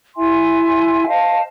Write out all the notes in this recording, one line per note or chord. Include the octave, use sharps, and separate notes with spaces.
E4 E5 G#5 C6
C5 D#5 F5 A5